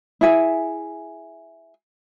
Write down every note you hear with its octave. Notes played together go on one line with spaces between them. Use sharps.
E4 G#4 E5 G#5